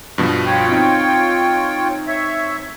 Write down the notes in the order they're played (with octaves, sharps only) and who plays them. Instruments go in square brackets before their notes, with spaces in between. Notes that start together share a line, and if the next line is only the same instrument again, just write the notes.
[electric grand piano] G2 B2 F3
[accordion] F4 C#5 G5
[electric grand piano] C4 D#4
[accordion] C#5 E5